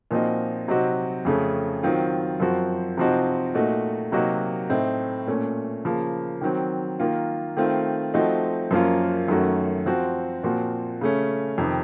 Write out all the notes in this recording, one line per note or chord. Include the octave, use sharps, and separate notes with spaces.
A#2 F3 C4 D#4 F#4
C3 F#3 C4 D#4 F#4
F2 C#3 A3 C#4
D#3 F#3 C4 F4
F#2 F3 C4 F#4
C3 F3 C4 D#4 F#4
A#2 A3 D#4 F#4
C3 F#3 A#3 D#4 F#4
A2 A3 C4 D#4
A#2 A3 C#4
C#3 F3 A#3
D#3 F#3 C4
D#3 A#3 F4
D#3 A3 C4 F4
F3 A3 C4 D#4 F#4
F#2 F3 A#3 C#4 F4
F#2 D#3 A3 C#4 F#4
F3 C4 F#4
A#2 F3 C4 F#4
C#3 A3 C#4
F2 C3 D#3